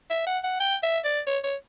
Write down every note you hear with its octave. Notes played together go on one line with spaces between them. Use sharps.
E5
F#5
F#5
G5
E5
D5
C#5
C#5